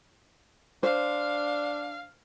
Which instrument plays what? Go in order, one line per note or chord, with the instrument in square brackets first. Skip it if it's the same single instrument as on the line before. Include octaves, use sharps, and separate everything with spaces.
[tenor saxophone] D4 [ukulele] C5 [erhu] F5